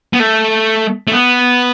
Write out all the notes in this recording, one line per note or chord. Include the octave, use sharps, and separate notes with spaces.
B3
A3
A3
B3